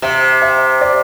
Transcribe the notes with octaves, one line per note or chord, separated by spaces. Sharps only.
C3 E5
E5
D5